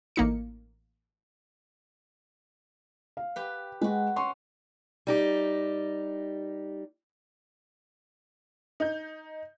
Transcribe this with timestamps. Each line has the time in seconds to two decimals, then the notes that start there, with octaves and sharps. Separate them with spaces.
0.16 A1 A#3 D#4 C#7
3.17 F5
3.36 G4 B4
3.81 G#3 F#4 B4
4.16 C#4 C6 C#6
5.07 G3 D#4 G4
8.80 D#4 G6